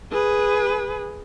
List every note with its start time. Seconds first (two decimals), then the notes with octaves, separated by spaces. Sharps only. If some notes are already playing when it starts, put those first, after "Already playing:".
0.12 G#4 B4